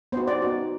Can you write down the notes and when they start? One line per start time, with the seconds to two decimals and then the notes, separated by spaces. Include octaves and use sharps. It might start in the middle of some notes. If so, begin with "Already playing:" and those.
0.12 B3 D#4 F#4 C5
0.28 D5
0.42 B3 D#4 F#4